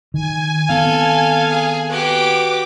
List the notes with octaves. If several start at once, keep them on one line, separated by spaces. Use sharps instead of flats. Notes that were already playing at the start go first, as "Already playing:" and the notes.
D#3 G#5
D#3 B3 C4 A4 F5
G#4
F#4 G4 B4 D6